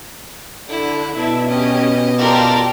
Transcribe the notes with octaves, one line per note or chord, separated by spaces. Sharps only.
D3 E4
B2 D4 E4 E5
C#4 G4 D#5
F4 G4 A4 A#4 D5 G5